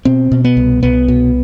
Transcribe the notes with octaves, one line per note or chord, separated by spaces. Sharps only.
B2 C4
B2
B3
C2
C2 B3
B2